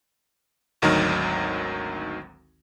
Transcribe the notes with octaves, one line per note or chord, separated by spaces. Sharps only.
G#1 D2 D#3 F#3 D#4 F6